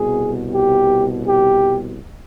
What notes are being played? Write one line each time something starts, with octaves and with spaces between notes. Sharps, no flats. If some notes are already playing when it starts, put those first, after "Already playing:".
Already playing: C2 B2 G#4
G4
G4